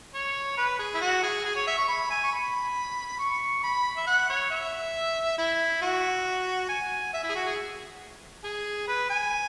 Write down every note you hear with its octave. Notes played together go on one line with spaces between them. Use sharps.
C#5
B4
G#4
E4
F#4
G#4
G#4
C#5
E5
C#6
B5
G#5
C#6
B5
C#6
B5
E5
F#5
C#5
E5
E4
F#4
G#5
E5
E4
G#4
F#4
G#4
G#4
B4
G#5